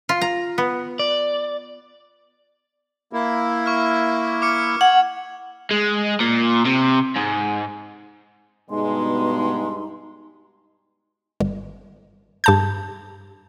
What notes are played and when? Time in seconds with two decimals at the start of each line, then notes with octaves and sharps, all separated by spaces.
0.09 F4
0.21 A#5
0.58 B3
0.99 D5
3.13 A#3 E4
3.66 C#6 F6
4.42 D6 F6 C#7
4.81 F#5 G#6
5.71 G#3
6.20 A#2
6.66 C3
7.16 G#2
8.70 G2 B2 G#3 B3 D#4 C6
11.40 G1
12.44 G2 A5 G6